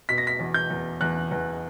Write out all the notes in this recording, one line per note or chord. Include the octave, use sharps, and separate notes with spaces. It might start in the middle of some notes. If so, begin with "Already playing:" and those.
B2 B6
A#6
B6
E2
G6
E2
E2 F#6
E2